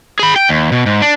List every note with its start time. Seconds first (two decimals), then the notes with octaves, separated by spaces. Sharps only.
0.19 G#4 B5
0.36 G5
0.49 D#2
0.72 B2
0.86 G#2
1.02 D4